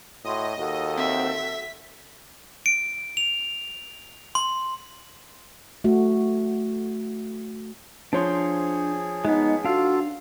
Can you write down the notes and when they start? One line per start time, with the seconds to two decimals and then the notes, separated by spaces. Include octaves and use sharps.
0.25 A2 F#4 D#5 C6
0.58 D#2 F#4 A4
0.97 C4 E5
1.35 B6
2.66 D7
3.17 F7
4.35 C6
5.84 A3 F#4
8.13 F3 D4 G#4 C5 C#5 C6
9.25 G#3 B3 D#4
9.65 D4 F4 F#4 A4 F5